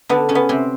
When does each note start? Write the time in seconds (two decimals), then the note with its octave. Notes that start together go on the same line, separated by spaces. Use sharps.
0.09 D3 B3 D4
0.29 C#3 C#4
0.35 B3
0.49 C3 C4